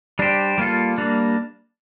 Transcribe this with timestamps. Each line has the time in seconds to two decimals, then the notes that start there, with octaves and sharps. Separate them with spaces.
0.19 G3 D4 G4 C5
0.58 G3 A#3 F4 A4
0.98 G3 A#3 D4